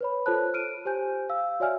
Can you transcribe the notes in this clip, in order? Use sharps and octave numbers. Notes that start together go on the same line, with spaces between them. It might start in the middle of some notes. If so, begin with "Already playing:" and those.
B4 C#5 B5
F4 A4 C5 C#5 A5 F#6
F6 D7 D#7
G4 C5 G#5 G6
F5 E6
F#4 C#5 D5 E5 G#5 F6